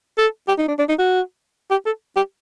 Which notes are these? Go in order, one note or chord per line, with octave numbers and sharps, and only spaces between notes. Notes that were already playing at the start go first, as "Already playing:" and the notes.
A4
G4
D#4
D4
D4
D#4
F#4
G4
A4
G4